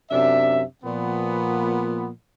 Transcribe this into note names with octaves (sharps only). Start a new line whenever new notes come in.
F#2 C3 D4 E5
A#2 F3 B3